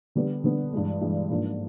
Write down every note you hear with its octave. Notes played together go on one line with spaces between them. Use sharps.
D3 G3 B3
D3 G3 B3
G2 E3 G#3
G2 E3 G#3
G#2 F3 A#3 D4